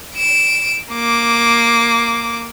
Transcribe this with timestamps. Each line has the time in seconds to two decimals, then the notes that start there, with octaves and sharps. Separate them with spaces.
0.15 D7 E7
0.93 A#3 D6